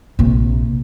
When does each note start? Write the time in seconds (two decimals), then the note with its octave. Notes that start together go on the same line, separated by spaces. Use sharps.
0.19 A#1 C3